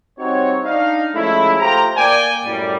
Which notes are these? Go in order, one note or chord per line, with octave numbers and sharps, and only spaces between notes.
G3 C4 D#4 F#4 C#5
D4 D#4 F5
F3 G#3 A3 C#4 E4
A3 F4 G4 C5 G5 A#5
A#3 D5 G5 G#5
F#2 A2 G3 D5